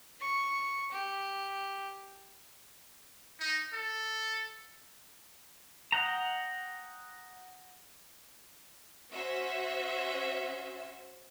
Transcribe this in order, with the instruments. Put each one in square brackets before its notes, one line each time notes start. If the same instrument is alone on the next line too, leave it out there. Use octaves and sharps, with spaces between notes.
[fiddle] C#6
G4
[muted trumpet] D#4
A4
[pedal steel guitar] D#5 F#5 G5 A#5
[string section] C#4 F#4 C5 E5